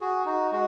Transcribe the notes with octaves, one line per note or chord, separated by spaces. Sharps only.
F#4 G#4
D#4 F#4
G#3 F#4